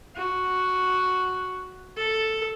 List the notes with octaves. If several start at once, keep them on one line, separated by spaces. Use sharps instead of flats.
F#4
A4